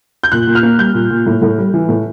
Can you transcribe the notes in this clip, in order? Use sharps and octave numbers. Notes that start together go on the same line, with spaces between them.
G6
A#2 F#6
A#2
F6
A#3
G3 G6
A#2
A#2
A2
A2
G3
E3
A2